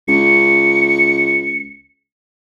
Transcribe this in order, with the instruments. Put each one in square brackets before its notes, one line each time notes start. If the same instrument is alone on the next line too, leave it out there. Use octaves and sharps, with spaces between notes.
[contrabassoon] C#2 [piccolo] C#7